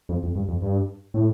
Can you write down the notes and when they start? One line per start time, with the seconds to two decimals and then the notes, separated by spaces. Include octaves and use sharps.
0.09 F2
0.23 F2
0.35 G2
0.49 F2
0.62 G2
1.14 A2